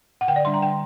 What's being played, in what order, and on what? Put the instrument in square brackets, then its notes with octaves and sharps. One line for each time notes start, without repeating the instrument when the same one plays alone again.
[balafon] F#5
D3 G5
D5
G3 D4 C6
A#5
D3 G5